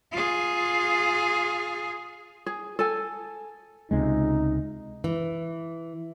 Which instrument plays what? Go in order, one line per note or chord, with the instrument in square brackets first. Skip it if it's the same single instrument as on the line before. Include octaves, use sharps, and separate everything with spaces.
[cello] F4 G#4
[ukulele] G#4
A4 G#5
[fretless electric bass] C#2 C3 G#3 [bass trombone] D#4
[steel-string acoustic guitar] E3